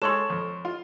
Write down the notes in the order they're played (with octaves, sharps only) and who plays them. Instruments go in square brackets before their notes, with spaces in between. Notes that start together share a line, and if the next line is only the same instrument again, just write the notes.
[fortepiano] G#3 [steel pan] A4 C#5 [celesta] C6 C#6 E7
[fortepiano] F2
F4